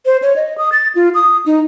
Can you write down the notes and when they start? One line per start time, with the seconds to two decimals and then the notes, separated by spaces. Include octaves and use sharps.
0.06 C5
0.22 C#5
0.36 D#5
0.58 D#6
0.72 A6
0.95 F4
1.14 D#6
1.46 D#4